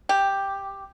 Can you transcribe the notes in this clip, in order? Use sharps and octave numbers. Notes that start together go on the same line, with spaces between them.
G4